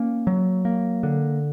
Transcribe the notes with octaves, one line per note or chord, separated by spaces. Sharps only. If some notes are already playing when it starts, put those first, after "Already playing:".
Already playing: A#3 C#4
F#3
A#3
D3